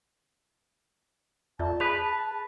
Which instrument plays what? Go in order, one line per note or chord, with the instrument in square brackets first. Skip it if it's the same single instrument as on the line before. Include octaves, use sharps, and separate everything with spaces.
[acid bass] F2 [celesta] F4 D5 E5 [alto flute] A5
[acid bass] G#4 [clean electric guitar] B4 [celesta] B5 F7